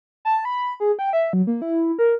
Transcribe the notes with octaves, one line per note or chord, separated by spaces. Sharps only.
A5
B5
G#4
G5
E5
F#3
A#3
E4
A#4